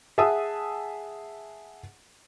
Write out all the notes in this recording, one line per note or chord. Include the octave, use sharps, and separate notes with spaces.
G#4 E5 F#5 A5 D#6 E6